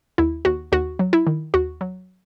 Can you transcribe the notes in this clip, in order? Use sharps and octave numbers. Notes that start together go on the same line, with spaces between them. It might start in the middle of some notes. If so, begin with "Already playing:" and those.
D#2 E4
D#2 F#4
D#2 F#4
F#3
E4
D#3
D#2 F#4
F#3